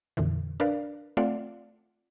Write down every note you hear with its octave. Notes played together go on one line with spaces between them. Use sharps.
F2 A#2 D3 E3
D4 A#4 B4 D5 F5
A3 C4 F4 D5 F5 F#5